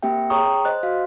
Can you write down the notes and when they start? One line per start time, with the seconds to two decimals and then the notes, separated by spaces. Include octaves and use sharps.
0.03 A#3 C4 G4 E5 G5
0.30 G#4 C#5 G5 A#5 C#6 D#6
0.65 C5 D#5 F#6
0.83 F#4 F5